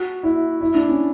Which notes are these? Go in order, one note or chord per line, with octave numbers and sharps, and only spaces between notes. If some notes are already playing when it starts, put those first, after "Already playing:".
Already playing: F#4
E4
E4
D4
C#4